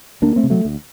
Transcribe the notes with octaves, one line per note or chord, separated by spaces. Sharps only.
D2 A#3 D4
A3 C4
C3
F#3 A3
D2